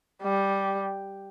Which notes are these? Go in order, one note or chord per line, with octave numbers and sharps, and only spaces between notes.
G3